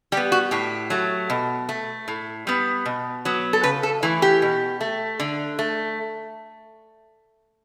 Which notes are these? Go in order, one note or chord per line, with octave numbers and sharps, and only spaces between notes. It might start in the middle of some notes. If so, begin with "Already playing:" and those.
G3 B3 G4
F#4
A2 G4
F#3 A3
B2
A3
A2
G3 B3
B2
F#3 B3
A4
C#3 B4
A4
E3 A3
G4
B2
A3
D3
A3